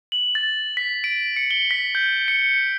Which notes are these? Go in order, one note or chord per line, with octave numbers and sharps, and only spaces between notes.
F#7
A6
B6
D7
C#7
G7
B6
G6
C#7